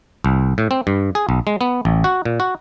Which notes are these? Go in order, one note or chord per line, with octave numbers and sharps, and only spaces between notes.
C2
A2
C4
G2
G#4
B1
G#3
B3
A1
F#4
A#2
F#4